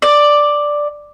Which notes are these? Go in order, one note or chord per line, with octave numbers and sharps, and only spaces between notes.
D5